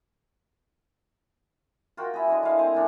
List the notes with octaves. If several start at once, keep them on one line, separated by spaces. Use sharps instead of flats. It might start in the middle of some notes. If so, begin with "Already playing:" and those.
F4 F#4 A#4 G5
E4 G#4
D3 D#5 C6
E4 F5
C4 G#5 A#5
A2 D4 A4